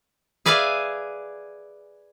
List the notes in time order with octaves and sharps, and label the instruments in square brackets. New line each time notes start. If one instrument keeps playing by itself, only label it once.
[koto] G#4 B4 D5 E5 F5 G#5